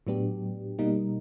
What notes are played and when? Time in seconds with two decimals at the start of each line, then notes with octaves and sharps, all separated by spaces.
0.07 A2 F#3 B3 D4 G4
0.79 B2 G3 A#3 D#4